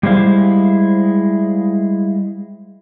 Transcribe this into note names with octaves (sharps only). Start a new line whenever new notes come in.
G3 G#3 E4 C5 F5